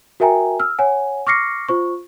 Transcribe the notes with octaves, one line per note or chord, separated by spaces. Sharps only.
F#4 A#4 E5 G5 G#5 A#5
E6 F6
C#5 F#5 G#5
C#6 D6 F6 A#6 C7 C#7
F4 C5 C#6